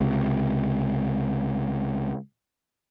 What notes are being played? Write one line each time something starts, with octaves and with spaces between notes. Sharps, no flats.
C#2 C3